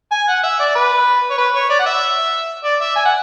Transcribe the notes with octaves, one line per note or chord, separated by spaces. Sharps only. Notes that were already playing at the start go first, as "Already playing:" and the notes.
G#5
F#5
E5
D5
B4
C#5
B4
C#5
D5
F#5
E5
D5
E5
G#5
F#5